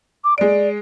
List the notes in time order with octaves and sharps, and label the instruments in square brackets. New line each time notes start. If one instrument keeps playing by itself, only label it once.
[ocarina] D6
[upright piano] G#3 D7 [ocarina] D5